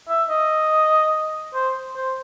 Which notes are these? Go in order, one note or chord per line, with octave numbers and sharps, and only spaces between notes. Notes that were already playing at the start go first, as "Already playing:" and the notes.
E5
D#5
C5
C5